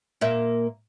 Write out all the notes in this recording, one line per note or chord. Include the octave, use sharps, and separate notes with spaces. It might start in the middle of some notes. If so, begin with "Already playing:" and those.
A#2 A#3 E5